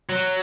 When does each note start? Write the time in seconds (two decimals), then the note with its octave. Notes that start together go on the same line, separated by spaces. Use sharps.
0.09 F#3